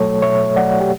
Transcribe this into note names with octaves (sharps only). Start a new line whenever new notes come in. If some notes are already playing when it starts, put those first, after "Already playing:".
Already playing: B2 F#3 A3 A4 C#5
B2 C#5 E5
F#3 A3 D5 F#5
G4